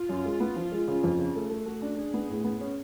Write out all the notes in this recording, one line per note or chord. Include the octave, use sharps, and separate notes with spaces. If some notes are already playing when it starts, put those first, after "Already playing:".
Already playing: F4
F#2
G#3
B3
F3
G#3
C#3
F2
C#3
A3 G#4
A3
A3 F#4
D4
D4 G#4
B3
A2
B3
C#4